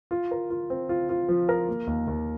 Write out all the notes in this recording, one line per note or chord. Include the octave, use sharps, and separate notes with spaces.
F4
A#4
F4
C4
F4
F4
F3
A#4
A#3
D#2
D#2